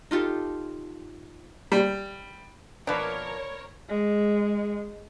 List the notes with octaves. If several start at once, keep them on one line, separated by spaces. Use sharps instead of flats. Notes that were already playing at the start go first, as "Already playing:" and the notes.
D#4 F4 G4 A4
G3
B2 F3 A#3 D4 A#4 B4 C#5
G#3